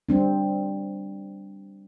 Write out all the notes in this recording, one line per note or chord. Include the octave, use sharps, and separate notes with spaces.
G3 C4 D4